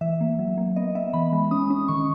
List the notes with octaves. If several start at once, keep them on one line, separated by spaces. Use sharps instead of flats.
E3 E5
A#3
F#3
A#3
B3 D#5
B3 E5
E3 B5
G#3
C#4 D#6
C#4
D#3 C#6